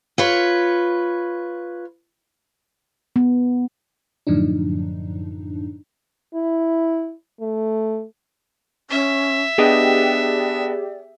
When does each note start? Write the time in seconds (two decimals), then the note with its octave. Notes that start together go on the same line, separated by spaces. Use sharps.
0.18 F4 B4 C#5
3.16 B3
4.27 F#2 A2 D3 F3 D4 D#4
6.35 E4
7.41 A3
8.91 C#4 E5
9.58 B3 D4 G4 G#4 D5 D#5 G5